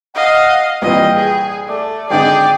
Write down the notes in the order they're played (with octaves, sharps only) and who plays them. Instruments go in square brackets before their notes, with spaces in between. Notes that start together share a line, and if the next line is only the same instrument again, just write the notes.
[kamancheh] D#5 F5 [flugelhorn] F#5
[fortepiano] C2 A#2 E3 [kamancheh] F4 D#5 [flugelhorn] G5
[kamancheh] G#4
[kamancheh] A3 [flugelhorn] D5
[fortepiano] G#1 D3 D#4 [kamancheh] G#4 D5 [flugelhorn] G5